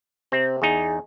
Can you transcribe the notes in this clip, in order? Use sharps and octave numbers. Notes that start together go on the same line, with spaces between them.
C3 C4
E2 D#4 G#4